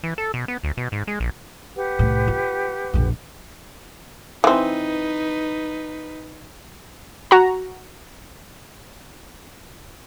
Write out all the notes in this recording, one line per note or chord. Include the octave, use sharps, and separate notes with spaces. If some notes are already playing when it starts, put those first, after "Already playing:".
E3
A4
B2
B3
D2
B2
G#2
G#3
A#1
G4 B4 F#5
C2 A2
F4
A#1 F2
E3 C4 D#4 B4
F#4 A#5